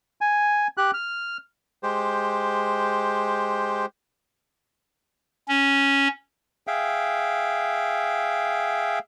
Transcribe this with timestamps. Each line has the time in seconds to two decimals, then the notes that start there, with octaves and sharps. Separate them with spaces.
0.21 G#5
0.77 G4 F#6
0.94 F6
1.83 G#3 G4 C5
5.48 C#4
6.67 G#4 E5 F5 G5